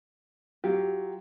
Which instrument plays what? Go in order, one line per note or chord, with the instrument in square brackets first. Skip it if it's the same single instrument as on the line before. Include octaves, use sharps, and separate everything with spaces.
[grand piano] F#3 [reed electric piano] F4 [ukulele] G4